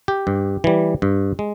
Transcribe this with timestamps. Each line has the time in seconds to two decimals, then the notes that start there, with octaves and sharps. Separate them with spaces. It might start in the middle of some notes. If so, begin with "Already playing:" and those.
0.08 G4
0.27 G2
0.64 E3 G3
1.02 G2
1.39 G#3